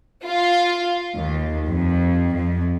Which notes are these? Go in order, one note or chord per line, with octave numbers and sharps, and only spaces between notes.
F4
D#2
F2
F2